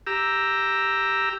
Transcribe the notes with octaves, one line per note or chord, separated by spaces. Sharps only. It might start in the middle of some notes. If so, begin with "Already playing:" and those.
G4 A#5 E6